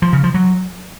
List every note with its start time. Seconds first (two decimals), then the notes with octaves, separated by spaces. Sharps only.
0.02 F3
0.13 C#3
0.24 F3
0.34 F#3